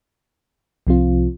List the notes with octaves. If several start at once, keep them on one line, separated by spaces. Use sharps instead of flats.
C2 C3 F3 C4 F4